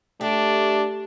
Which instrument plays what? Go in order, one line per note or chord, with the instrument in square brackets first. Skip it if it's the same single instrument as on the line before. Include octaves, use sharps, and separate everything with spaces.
[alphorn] A3 [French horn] D4 [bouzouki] G4